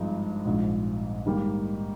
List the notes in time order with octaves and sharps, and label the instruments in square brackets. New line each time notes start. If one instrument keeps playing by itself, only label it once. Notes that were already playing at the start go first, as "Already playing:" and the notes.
Already playing: [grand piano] G#1 G2 F3 G#3 D#4
A#1 G#2 F3
G#2 D#3 G3 A#3